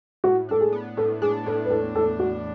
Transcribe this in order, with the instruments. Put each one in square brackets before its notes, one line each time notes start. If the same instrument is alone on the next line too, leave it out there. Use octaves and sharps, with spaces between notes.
[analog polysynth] A2 [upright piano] F#4
[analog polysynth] D4 [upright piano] A4
[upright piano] G#4
[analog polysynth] B3
[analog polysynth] A2 [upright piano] A4
[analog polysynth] D4 [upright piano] G#4
[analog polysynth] A2 [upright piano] A4
[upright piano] B4
[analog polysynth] E2 [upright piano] A4
[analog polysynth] E2 [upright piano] A4
[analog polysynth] E2 [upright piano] F#4